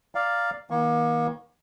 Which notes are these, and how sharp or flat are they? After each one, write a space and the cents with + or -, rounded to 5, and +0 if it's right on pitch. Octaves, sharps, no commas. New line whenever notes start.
D5 +0 F5 +0 A#5 +0
D#3 +35 A#3 +35 C#6 +0